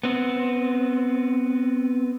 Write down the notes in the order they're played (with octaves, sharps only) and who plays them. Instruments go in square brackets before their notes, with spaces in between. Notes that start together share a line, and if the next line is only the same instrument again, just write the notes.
[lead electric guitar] B3 C4